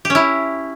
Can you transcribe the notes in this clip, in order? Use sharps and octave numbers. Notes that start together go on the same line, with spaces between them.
G4
C#4
E4